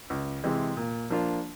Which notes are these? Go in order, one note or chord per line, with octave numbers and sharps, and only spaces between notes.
C#2
C3 E3 G#3
A#2
F3 A#3 D4 F4